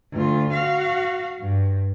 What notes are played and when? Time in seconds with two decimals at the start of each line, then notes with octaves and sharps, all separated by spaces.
0.12 D2 F4
0.53 F#4 F5
1.40 G2